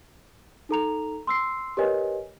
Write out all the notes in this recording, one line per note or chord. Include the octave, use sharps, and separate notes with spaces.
D#4 A4 A#5 F7
C6 E6 C7
G4 A#4 B4 C#5 D#5 G#5